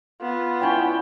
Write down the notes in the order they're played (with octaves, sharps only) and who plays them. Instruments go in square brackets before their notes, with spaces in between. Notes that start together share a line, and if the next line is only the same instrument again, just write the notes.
[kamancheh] B3 [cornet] F4
[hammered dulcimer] C#4 E4 D5 [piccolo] G5